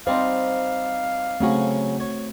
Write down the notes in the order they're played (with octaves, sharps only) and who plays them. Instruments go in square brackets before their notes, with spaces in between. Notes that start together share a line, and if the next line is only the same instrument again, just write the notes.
[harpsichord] G3 C4 D#4 [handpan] C5 [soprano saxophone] F5
[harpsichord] C#3 F#3 C#4 [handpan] A3 C4 F#4
[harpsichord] C#5